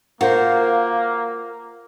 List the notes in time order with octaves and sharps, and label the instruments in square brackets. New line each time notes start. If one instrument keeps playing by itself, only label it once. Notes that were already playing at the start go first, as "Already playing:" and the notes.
[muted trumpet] A#3 [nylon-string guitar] F4 A#4 C5 [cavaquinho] F#4